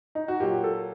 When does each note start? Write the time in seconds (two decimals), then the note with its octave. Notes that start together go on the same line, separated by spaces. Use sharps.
0.15 D#4
0.28 F#4
0.40 A#2 F#3 G4
0.64 A4